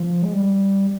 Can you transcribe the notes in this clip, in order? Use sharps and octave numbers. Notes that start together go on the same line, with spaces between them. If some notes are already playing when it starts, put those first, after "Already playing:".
Already playing: F3
G#3
G3